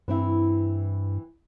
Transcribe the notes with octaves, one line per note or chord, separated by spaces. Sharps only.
G2 E3 C4 E4